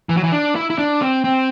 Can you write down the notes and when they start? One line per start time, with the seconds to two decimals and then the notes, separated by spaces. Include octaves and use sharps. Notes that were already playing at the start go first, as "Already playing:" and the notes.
0.09 E3
0.17 F#3
0.24 E3
0.32 D4
0.55 E4
0.70 E4
0.78 D4
1.01 C4
1.24 C4